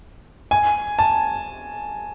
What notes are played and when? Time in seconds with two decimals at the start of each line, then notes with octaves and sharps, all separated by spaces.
0.51 G#5
0.99 A5